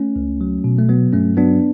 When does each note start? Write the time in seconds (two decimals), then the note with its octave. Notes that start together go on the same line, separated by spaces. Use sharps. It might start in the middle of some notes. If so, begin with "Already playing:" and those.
Already playing: A3 C#4
0.16 C#2
0.41 F#3
0.64 B2
0.79 A3
0.89 F#3 B3
1.13 G2 A3 C#4
1.37 F#3 B3 D4